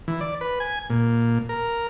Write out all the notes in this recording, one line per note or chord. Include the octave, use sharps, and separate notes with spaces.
E3
D5
B4
G#5
A#2
A#4